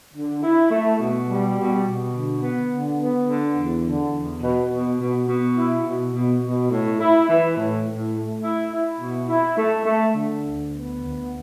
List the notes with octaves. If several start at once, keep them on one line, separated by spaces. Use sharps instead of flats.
D3
E4
A3
B2
G3
B2
B2
D3
B3
D3
B3
D3
E2
D3
E2
B2
B2
B2
B2
E4
B2
B2
B2
A2
E4
E3
A2
A2
A3
E4
E4
B2
E4
A3
A3
D3
D2
B3
D2